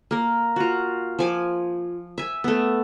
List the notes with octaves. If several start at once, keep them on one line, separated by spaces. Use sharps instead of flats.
A#3 A#4
F4 F#4
F3 G#5 D6
E5 G#5
A3 B3